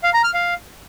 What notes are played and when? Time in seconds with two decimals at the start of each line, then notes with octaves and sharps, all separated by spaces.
0.04 F5
0.14 A#5
0.24 F6
0.34 F5